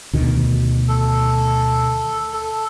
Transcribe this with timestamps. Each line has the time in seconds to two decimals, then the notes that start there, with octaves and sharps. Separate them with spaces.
0.13 D2 B2 D#3
0.88 A4
2.33 A4